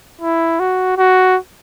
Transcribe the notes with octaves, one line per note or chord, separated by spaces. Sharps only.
E4
F#4
F#4